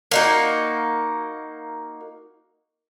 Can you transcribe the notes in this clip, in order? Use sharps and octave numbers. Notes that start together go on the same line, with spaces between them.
A#3 D#4 F#4